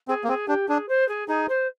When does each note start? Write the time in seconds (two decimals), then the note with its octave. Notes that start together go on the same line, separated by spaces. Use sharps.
0.08 C4 G#4
0.24 A#3
0.28 C4 G#4
0.48 D4 G4
0.68 D4 G#4
0.89 C5
1.09 G#4
1.28 D#4 G#4
1.49 C5